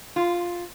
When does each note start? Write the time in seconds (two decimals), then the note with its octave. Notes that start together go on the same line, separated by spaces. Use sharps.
0.16 F4